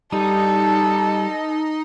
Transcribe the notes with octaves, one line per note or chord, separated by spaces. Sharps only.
G3 D#4 A4